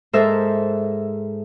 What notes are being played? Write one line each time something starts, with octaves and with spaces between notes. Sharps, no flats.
G#2 A4 A#4 C5 E5 A5